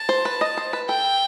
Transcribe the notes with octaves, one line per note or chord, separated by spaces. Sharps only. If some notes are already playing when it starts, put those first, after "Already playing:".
Already playing: A5
C5
B4
D#5
C5
B4
A4 G5